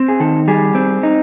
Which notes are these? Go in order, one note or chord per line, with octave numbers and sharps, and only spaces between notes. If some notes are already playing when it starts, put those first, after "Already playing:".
Already playing: C4
G#4
D#3 A4
G3 G#4
C4
D#4